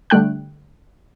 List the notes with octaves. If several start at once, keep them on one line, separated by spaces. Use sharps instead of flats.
D3 G3 A3 G5 F#6